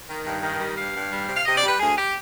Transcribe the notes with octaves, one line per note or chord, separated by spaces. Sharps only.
D#3
G2
D#3
G3
G2 F5
G2
G3
C3
F5
C3 D#5
D5
G3
B4
D2 G#4
G4